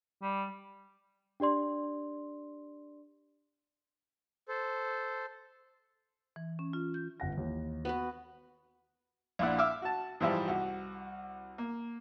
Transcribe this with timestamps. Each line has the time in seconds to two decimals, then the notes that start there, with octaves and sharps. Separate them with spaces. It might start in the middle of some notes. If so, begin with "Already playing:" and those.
0.22 G3
1.40 D4 G4 D5 C6
4.48 A4 C5
6.36 E3
6.59 C#4
6.73 F4
6.94 G6
7.20 G1 F#5 A#6
7.37 D#2 E3
7.85 B3 F#4 B4
9.39 A#1 A#2 D4 E4 F#5
9.58 E5 D6 E6 F6
9.82 F#4 A5
10.20 G#2 E3 F3 G3 E4
10.48 C2 F#4
11.58 A#3